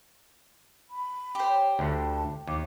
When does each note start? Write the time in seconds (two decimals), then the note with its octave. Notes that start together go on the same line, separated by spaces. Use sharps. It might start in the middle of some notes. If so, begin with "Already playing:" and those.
0.90 B5
1.35 G4 C5
1.48 C#5
1.79 D2 D3 A5
2.48 D#2 D6